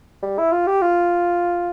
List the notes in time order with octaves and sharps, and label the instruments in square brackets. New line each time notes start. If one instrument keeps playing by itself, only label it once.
[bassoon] G3
E4
F4
G4
F4